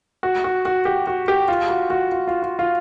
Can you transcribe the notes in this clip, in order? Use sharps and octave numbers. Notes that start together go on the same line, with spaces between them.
F#4
F#4
F#4
G4
F#4
G4
F4
F#4
F#4
F4
F4
F4
F4